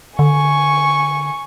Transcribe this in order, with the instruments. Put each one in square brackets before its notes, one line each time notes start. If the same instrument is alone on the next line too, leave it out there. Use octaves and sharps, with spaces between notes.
[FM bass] D3 [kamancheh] G#5 C#6